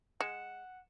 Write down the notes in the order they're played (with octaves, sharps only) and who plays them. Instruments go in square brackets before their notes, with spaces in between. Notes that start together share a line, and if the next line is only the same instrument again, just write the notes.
[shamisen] G#3 [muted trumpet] F#5 [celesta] C#7 E7